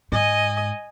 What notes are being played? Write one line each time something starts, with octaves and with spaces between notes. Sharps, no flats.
G#2 D#5 G#5